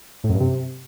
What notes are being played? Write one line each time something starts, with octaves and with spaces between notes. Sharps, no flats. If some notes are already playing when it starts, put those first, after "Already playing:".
A2
F#2
G2
C3